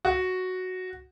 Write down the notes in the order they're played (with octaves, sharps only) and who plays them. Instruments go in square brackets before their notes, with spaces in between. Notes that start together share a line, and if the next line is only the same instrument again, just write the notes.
[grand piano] F#4